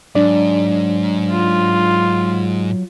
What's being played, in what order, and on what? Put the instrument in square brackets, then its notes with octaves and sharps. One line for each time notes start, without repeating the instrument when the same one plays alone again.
[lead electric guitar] G#2 [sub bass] F#3 [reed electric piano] D4 D5
[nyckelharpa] F4